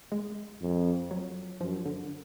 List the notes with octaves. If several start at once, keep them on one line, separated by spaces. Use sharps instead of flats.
G#3
F2
F#3
F#2 F3
D3